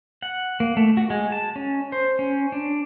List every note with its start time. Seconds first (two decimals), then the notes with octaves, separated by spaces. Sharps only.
0.22 F#5
0.60 A#3
0.77 A3
0.97 F#4
1.10 G#3
1.32 A5
1.56 C#4
1.92 C5
2.19 C#4
2.52 D4